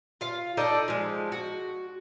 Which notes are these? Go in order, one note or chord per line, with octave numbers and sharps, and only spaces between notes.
F4 F5
D4 D#4 A4 D#5
F3 G#3
F#4